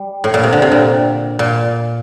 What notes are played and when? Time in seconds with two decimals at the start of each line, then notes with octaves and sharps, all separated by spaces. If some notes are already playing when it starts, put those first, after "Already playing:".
Already playing: G3
0.24 A2
0.34 A#2
0.43 C3
0.53 D3
0.62 C3
0.72 A#2
1.39 A#2